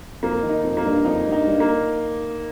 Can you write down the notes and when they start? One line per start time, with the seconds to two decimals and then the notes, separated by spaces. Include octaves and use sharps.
0.23 F2 A#3
0.43 D#3
0.49 D#4
0.64 F2
0.77 A#3
0.85 G2
1.05 F2 D#4
1.26 G2
1.32 D#4
1.47 G2
1.60 A#3